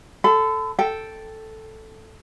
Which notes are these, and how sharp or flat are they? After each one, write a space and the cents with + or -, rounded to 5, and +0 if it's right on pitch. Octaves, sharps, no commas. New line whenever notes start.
A4 +0 B5 +45
A4 +0 G5 +0